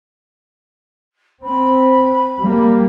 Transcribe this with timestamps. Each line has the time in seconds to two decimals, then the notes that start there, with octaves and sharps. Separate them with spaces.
1.44 C4 B5
2.42 G3 A#3